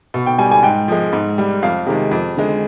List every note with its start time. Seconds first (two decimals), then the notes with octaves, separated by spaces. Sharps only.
0.14 B2
0.26 G5
0.38 G3 G#5
0.51 G#5
0.63 G#2 G5
0.88 F3 G#3
1.13 G#2
1.38 G3
1.62 F2 F5
1.86 C3 D#3 G#3
2.11 F2
2.37 D3 G#3